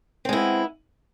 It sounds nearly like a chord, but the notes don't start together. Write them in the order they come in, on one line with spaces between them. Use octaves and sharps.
C4 G#3 E4 B3